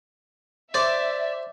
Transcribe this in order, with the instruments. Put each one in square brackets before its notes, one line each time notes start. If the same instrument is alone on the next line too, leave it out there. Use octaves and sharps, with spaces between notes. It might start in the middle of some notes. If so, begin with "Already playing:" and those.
[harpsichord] C5 [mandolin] D5 [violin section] E5